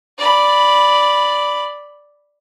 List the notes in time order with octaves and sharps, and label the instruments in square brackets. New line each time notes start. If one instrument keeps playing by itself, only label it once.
[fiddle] D5 B5